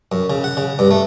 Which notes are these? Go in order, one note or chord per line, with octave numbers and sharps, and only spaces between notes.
F#2
C#3
F#5
C#3
G2
A3